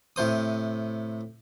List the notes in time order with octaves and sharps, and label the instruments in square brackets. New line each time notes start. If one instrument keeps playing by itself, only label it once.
[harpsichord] A2 C3 C5 D#6